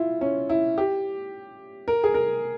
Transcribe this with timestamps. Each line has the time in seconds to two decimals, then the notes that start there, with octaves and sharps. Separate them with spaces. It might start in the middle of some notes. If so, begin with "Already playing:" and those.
Already playing: E4 F4
0.21 C#4
0.50 E4
0.78 G4
1.88 A#4
2.04 G#4
2.14 A#4